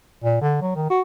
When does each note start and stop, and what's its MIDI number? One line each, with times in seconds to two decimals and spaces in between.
0.24 0.38 46
0.41 0.60 50
0.62 0.73 54
0.76 0.87 51
0.90 1.02 66